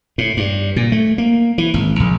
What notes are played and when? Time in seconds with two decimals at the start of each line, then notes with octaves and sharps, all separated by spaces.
0.18 A2
0.37 G2
0.76 A#2
0.92 A3
1.18 A#3
1.58 E3
1.74 G#1
2.00 A#1